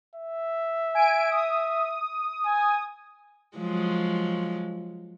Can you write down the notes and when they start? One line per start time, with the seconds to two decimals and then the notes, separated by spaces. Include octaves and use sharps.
0.16 E5
0.95 G#5 D7
1.31 D#6
2.46 G#5
3.58 F3 F#3 G#3